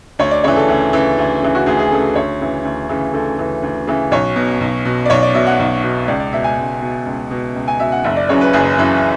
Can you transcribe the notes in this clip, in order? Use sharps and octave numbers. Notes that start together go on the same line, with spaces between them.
D2 C#5
D5
C#3 E3 C#5
A4
D2
C#3 E3
D2
C#3 E3
F#4
D2 G#4
G#4
C#3 E3 A4
D2 C#5
C#3 E3
D2
C#3 E3
D2 A4
C#3 E3
D2
C#3 E3
B1 C#5
B2
B1
B2
D5
B1 C#5
D5
B2 E5
F#5
B1
B2
C#2 D5
D5
B2 E5
G#5
C#2
B2
C#2
B2
C#2
G#5
B2 E5
F#5
F#1 E5
D5
F#2 C#3 E3 C#5
B4
F#1 G#4
F#2 C#3 E3